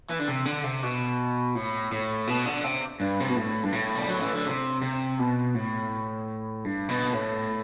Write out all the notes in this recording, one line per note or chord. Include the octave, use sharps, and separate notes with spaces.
E3
D3
C3
D3
C3
B2
A2
A2
B2
D3
C3
G2
C3
B2
A2
G2
A2
G3
F#3
E3
D3
C3
C3
B2
A2
G2
B2
A2